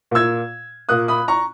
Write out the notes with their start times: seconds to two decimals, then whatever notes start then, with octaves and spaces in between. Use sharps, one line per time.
0.11 A#2 A#3 E6 G#6
0.89 A#2 A#3 D#6 F#6
1.08 B5 D#6
1.28 A#5 C#6